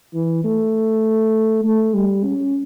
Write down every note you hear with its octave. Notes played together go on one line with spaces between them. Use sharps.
E3
A3
A3
G3
C#4